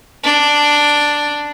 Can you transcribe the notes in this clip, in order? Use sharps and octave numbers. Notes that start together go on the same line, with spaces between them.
D4